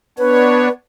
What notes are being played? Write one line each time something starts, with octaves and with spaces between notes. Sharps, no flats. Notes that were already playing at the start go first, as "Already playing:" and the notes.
B3 D4 B4 C#5